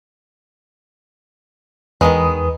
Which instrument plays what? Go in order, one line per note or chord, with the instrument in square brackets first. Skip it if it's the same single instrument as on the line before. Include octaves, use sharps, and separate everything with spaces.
[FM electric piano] E2 B4 D#6 [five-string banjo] D#3 F#3 G#3